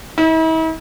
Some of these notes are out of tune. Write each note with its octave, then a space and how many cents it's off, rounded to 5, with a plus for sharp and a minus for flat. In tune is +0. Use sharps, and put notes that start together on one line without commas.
E4 -45